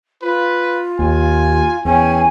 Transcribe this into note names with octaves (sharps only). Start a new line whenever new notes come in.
F4 B4
D#2 G#5
E2 C#4 G5 G#5